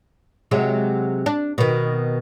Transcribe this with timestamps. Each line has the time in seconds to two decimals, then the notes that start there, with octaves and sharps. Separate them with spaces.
0.51 C3 F#3 G#3
1.26 D4
1.58 B2 D#3